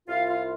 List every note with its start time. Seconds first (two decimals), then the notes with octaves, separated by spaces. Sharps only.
0.08 C2 F4 F5
0.28 F4 F5